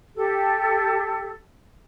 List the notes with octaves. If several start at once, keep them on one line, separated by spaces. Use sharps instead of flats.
G4 A4